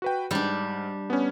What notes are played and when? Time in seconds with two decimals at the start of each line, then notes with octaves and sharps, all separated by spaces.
0.02 F#4 B4 G5
0.31 G#2 G3 D4
1.10 B3 C#4